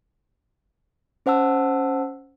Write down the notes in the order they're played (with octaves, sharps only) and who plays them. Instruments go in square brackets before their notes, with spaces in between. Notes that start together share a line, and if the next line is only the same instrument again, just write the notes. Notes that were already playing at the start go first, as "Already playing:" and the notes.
[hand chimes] C#4 C5 F#5 A5 E6